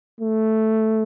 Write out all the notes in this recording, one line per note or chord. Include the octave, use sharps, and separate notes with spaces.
A3